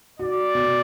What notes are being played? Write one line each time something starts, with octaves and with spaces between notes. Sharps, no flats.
F#4 D5
B2